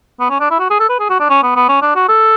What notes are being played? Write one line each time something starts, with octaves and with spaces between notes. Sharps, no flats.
B3
C#4
D4
E4
F#4
G#4
A4
B4
G#4
F#4
D4
C#4
B3
B3
C#4
D4
F#4
A4